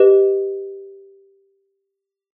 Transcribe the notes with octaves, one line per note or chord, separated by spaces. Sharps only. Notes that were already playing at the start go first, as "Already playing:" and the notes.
Already playing: G4 B4 D#5